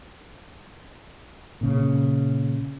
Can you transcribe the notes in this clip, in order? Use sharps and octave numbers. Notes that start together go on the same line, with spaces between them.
A#2 C#3